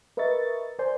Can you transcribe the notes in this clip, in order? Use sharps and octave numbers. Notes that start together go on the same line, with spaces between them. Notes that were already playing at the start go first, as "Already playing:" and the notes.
A#4 B4 D#5 E5 C#6 A6
A#4 C5 D5 G#5 C6 G6